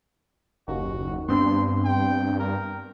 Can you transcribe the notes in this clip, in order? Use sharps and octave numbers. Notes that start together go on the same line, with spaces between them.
F#1 D#2 F#4
G2 B3 C4 D4 C6
G5
A#4